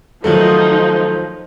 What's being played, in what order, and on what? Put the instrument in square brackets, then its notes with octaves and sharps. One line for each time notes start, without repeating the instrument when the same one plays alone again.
[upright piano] D#3 F#3 A3 [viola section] F3 D#4